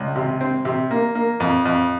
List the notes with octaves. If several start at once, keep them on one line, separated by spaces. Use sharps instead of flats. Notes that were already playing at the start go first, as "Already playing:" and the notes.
Already playing: C#2
C3
C4
C3
A#3
A#3
F2
F2